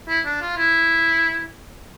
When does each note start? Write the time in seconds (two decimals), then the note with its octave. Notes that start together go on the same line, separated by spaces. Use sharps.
0.08 E4
0.25 D4
0.41 F4
0.57 E4